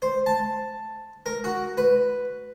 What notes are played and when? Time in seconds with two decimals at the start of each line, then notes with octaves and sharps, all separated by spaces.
0.02 C5
0.26 A5
1.26 A#4
1.44 F#4
1.78 B4